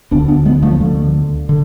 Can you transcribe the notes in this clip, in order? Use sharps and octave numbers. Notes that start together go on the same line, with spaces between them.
D2 D3 B3 D4
B3 D4
G#3 B3
F3 A3
D3
D3